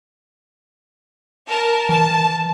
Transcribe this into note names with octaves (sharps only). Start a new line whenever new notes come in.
A#4 A5
E3 A5